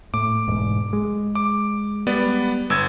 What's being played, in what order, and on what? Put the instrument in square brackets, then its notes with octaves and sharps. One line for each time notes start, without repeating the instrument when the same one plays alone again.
[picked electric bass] A2 [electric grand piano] D6
[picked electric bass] E1 G#2
G#3
[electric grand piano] D6
G3 B3 D5
G1 E6 G#6